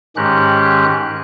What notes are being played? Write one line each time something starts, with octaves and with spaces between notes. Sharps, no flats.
G#2 D#3 G#3 C#4 G4 F#6